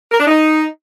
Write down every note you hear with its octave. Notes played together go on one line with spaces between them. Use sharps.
A#4
D4
D#4